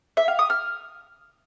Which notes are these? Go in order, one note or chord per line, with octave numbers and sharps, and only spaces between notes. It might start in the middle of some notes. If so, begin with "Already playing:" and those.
E5
F5
D#6
F6